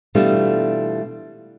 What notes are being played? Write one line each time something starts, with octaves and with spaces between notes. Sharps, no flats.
B2 E3 G3 A3 D4 F4